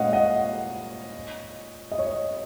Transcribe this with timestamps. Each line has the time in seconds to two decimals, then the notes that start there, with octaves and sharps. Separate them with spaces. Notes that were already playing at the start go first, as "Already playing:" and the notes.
Already playing: A#2 G#3 C#4 D#5 F5 F#5
0.13 D#5 F#5
1.92 D#5
1.99 C#5
2.07 D#5